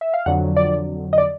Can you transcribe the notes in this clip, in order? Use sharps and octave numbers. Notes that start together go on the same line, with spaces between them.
E5
F5
F2 D3 F#3 F#5
D5
D#5
D5